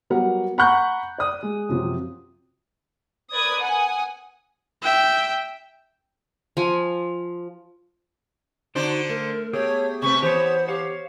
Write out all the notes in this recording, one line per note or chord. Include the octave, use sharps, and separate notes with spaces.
F#3 G3 B3 F#4 A#4 F#5
F#5 A#5 B5 C#6 F#6 G6
D5 D#6
G#3
F#2 C3 F3
A#4 B4 D5 D#6 G#6
F#5 G#5 D#6
E5 G5
F3 G#5
D3 D4 D#4 F#4 C5 D5
A3 A#4
A3 B3 G4 G#4 C#5
C3 A3 B4 C#6
E3 B3 G4 C5 C#5
G4 C5 C#5 F5